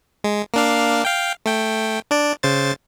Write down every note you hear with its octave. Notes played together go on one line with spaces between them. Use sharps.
G#3
A#3 D4 F5
F5 G5
A3 G5
D4 D5
C#3 C5 A6